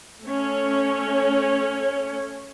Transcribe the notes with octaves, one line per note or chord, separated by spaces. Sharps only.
A3 C#4 C#5